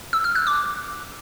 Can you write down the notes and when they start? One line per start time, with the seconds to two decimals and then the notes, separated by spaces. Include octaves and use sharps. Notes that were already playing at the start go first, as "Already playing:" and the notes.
0.13 E6
0.24 F6
0.35 F#6
0.47 D6